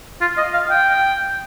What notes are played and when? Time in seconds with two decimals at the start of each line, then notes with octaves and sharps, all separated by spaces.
0.21 F4
0.38 D#5
0.54 F5
0.70 G5